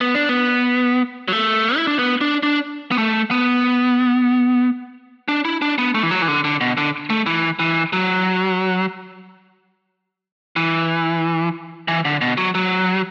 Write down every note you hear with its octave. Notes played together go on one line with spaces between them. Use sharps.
B3
D4
B3
F#3
A3
E4
D4
B3
D4
D4
B3
A3
B3
D4
E4
D4
B3
A3
E3
F#3
E3
D3
D3
B2
D3
A3
E3
E3
F#3
E3
E3
D3
B2
F#3
F#3